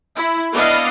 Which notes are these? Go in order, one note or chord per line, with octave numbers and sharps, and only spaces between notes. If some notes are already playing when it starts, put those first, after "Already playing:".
E4
B3 D4 E4 D#5 F5